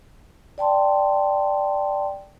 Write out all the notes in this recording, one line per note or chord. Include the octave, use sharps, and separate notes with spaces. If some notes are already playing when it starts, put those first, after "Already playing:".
D5 G5 A5 C6